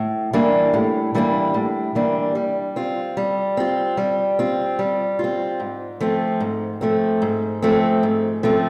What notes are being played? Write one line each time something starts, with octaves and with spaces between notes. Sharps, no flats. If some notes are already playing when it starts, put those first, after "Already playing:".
Already playing: A2
E3 G3 A#3 D4
A2
E3 G3 A#3 D4
A2
E3 G3 A#3 D4
G3
C4 F4
G3
C4 F4
G3
C4 F4
G3
C4 F4
G#2
F3 A3 C4
G#2
F3 A3 C4
G#2
F3 A3 C4
G#2
F3 A3 C4